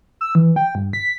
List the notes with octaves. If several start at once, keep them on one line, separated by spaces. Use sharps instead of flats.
E6
E3
G5
G2
B6